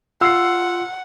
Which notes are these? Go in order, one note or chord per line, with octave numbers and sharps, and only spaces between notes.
F4 F#5 C6 E6 F6 C7